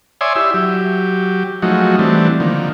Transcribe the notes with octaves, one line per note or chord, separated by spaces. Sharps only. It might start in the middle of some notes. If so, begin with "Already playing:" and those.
C#5 D5 E5 G#5 C6 D#6
E4 G4 E5
F#3 G4
F3 F#3 G#3 A3 D#4 F#4
E3 G3 A3 C4 D4
D3 D#3 F3 A#3